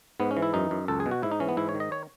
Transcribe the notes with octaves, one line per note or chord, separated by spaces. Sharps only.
G#2 B3
C#4
E3
E4
F#2 D#4
F#2
C#2 A4
G#4
B2
F#4
G#2 E4
D#4
E3 C#4
B3
G#2 E4
C#5
D#3
D#5
C#5